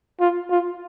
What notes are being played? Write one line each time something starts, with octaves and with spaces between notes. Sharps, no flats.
F4
F4